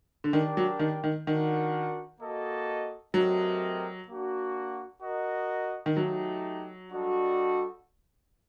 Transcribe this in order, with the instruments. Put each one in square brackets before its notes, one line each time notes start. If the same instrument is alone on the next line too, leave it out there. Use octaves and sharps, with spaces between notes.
[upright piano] D3
[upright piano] D#3 [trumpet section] D4 G4 A#4 D5 G5
[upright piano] F#3
D#3
D#3
[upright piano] D#3 [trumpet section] D4 F#4 A#4 F#5
[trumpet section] A#3 F#4 A4 D#5
[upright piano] F#3 [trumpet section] A3 C4 G4 A#4 D#5
[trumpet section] A#3 D4 F#4
F#4 A#4 D#5
[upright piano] D#3
[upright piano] F#3 [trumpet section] A3 D#4 G4
[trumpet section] G3 D4 F#4 A4 D#5